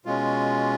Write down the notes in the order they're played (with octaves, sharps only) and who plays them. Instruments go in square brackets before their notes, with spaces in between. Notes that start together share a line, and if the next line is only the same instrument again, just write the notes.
[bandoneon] B2 G#3 C#4 F4